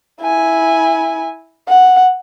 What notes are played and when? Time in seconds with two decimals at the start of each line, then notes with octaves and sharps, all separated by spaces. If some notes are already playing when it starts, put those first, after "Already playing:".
0.21 E4 G#5
1.68 F#5